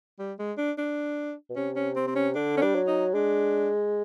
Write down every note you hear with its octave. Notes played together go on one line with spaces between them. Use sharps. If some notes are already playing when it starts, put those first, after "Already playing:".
G3
G#3
D4
D4
B2
C3 C#4
C#4
C4
C4
C#4
D3 D4
C#4
G3 D4
F#3
D#4
G#3 D4